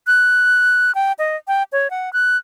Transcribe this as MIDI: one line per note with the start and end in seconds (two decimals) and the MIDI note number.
0.07 0.94 90
0.95 1.12 79
1.19 1.36 75
1.48 1.63 79
1.72 1.90 73
1.91 2.12 78
2.13 2.37 90